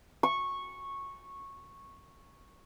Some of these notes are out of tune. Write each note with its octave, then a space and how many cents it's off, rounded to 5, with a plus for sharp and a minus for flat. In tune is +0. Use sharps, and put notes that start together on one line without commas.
C#6 -10